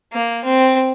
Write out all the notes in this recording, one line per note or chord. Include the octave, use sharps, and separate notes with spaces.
A#3
C4